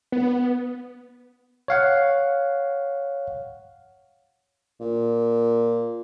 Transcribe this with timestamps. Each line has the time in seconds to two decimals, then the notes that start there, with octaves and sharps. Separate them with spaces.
0.12 B3
1.68 C#5 F5 F#5
4.80 A#2